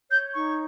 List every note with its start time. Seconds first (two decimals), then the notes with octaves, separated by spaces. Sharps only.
0.10 C#5 G6
0.34 D#4 C#6